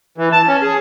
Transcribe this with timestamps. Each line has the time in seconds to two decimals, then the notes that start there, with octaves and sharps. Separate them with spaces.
0.18 E3
0.32 A5
0.48 C#4
0.62 G#4